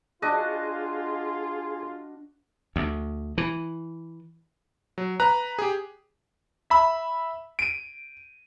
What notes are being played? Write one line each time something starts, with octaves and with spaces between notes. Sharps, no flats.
D4 F4 F#4 G#4 D#5
D2
E3
F#3
B4 A#5 F#6
G4 G#4
E5 B5 E6
D7 D#7